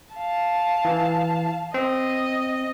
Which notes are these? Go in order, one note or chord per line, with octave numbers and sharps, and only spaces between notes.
F5 A5
E3
C4 D#5